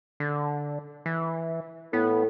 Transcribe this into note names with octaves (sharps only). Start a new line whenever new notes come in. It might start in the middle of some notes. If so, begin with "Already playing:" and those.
D3
E3
A2 B3